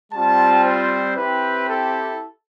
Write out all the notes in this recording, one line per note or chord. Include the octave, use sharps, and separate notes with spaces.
G3 C4 F4 A5
C5
C4 E4 G4 B4
A4